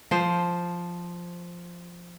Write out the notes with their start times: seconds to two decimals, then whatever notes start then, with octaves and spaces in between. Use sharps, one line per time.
0.11 F3 C5